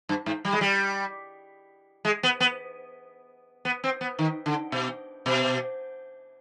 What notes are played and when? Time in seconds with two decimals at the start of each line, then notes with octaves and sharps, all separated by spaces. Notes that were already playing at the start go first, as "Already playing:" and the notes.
0.09 G2
0.26 G#2
0.45 G3
0.53 G#3
0.61 G3
2.05 G#3
2.23 B3
2.40 B3
3.65 B3
3.84 C4
4.01 B3
4.19 D#3
4.46 D3
4.72 B2
5.26 B2